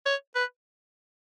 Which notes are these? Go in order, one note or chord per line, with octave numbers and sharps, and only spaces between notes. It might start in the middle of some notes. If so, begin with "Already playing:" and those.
C#5
B4